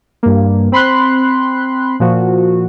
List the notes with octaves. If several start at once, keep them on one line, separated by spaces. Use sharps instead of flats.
G2 A#3
C4 B5 C6 F#6
A#2 F3 F#4